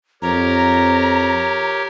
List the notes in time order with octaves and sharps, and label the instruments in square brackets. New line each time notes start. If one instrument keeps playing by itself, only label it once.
[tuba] F2 [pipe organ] G4 A#4 C#5 [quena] A#5